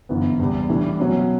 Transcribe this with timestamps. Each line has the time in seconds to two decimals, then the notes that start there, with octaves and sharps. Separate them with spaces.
0.09 G1 F#2 E3 B3
0.39 E2 C#3 G3
0.69 A2 E3 G3 D4
0.99 B2 F#3 C#4 F#4